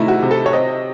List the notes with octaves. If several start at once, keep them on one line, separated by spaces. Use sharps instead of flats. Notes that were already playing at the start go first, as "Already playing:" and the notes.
Already playing: C3 D#3 A3 D#4 E4
F#4
C3
A4
C#5
C4 D#5